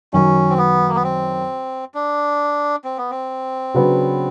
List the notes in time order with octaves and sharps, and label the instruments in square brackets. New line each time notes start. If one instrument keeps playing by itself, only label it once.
[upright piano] F#2 D#3 F#3 [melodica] C#4
[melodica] C4
B3
A#3
B3
C4
D4
C4
B3
C4
[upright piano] C#3 F#3 B3 D4